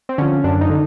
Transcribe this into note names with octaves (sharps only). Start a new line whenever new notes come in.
C4
D3 F3 C#4
F#2 D4
D#4
D3